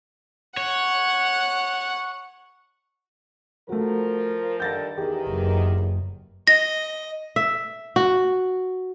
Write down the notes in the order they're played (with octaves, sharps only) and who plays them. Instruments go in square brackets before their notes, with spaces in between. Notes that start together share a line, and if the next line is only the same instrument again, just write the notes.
[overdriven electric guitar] C#5 [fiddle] F#5
[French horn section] F3 A#4 [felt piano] A3 F#4
[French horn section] G2 D3 D#3 [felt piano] G6 A6 A#6
[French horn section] E2 D#3 [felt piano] G4 G#4
[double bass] F#1
[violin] D#5 [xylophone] A#6
[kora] E5
F#4